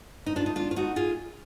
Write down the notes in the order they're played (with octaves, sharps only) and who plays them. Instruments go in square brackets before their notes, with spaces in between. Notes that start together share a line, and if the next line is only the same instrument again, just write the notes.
[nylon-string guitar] D#4
D4 F4
D#4
D4 F4
F4
D#4 F#4
F4 G#4